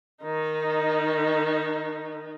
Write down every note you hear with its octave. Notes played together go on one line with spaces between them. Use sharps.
D#3 D#4